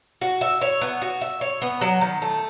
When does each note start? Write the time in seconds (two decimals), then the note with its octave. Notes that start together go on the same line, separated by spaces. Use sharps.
0.21 F#4
0.41 E5
0.61 C#5
0.82 B3
1.02 F#4
1.21 E5
1.41 C#5
1.62 B3
1.81 F#3
2.01 D#3
2.22 A3